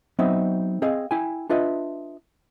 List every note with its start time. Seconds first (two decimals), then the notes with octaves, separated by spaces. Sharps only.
0.19 F#3 B3 C4 D#4 D#5 E5
0.82 C4 G#4 D#5 F5
1.11 E4 G5 G#5
1.49 D4 F4 B4 D#5 E5